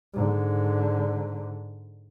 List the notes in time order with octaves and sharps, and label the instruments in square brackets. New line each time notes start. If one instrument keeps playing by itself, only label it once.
[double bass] G#2 D3